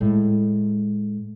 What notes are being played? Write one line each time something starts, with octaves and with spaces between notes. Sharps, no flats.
A2 G#3